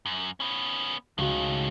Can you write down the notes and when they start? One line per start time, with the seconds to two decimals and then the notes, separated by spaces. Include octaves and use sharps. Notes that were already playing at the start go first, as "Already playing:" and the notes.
0.06 F#2
0.40 B3 C#4
1.18 C#2 A2 D#3 F#4